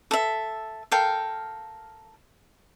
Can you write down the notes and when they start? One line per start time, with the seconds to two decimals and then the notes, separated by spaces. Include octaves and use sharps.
0.11 A4 E5
0.92 A4 A#4 F5 G5